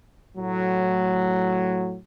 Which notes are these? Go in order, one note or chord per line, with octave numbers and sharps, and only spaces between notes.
A2 F#3